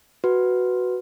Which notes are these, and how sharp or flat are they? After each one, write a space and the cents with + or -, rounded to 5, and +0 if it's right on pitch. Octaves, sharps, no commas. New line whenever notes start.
F#4 +0 B4 +0